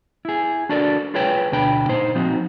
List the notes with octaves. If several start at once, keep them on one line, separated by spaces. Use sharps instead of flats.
E4 G#4
D4 F#4 A4 A#4 D5
F4 G#4 B4 C#5 G5
D2 B2 D4 G5 B5
A#2 D#4 C5
F3 C4 D#4 F#4